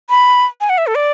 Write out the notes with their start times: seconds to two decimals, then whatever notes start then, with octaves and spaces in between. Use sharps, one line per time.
0.10 B5
0.61 G#5
0.70 F#5
0.78 E5
0.87 A4
0.95 D5